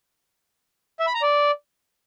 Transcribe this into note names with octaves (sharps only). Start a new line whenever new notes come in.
E5
B5
A#5
D5